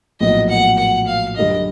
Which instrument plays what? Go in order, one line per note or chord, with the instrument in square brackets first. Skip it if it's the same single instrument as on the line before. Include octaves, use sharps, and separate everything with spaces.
[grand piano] A#1 A2 F#3 B3 [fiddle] D#5
[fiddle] F#5
F#5
F5
[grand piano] F#2 D3 G3 [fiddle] D#5